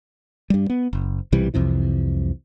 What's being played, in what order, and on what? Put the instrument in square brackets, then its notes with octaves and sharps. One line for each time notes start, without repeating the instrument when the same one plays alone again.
[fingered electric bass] G2 G3
B3
F#1
B1 C3 E3 G3
C2 F2 C3 E3